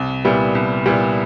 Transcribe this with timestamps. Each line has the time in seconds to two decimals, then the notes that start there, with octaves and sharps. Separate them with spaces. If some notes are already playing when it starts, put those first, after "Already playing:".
Already playing: C2
0.25 A#2 G3 B3 E4
0.55 C2
0.86 A#2 G3 B3 E4